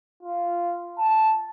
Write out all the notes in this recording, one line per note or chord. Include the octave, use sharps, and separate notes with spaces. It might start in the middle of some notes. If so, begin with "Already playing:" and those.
F4
A5